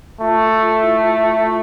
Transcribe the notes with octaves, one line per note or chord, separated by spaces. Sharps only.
A3 F4
E4
F4